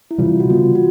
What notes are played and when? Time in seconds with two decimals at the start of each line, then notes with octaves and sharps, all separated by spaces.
0.11 E4
0.18 C3 E3 G3 F4
0.40 F#4
0.49 C#3 E3 G3 B3 F4
0.75 F#4